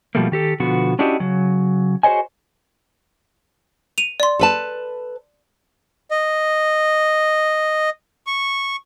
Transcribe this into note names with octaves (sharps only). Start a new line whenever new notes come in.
B2 F3 G3 A3 A#3
D#3 G4 A4
B2 D3 F3 B3 F#4
C#4 D4 E4 F#4 G4 D#5
C#3 F#3
F#4 G#4 C5 C#5 D#5 G#5
D#7 F7
D5 C6
A4 B4 A5
D#5
C#6